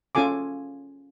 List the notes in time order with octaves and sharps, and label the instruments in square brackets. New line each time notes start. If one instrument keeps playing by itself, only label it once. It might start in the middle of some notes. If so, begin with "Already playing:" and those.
[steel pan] C#4 F4 A4 G#5 D6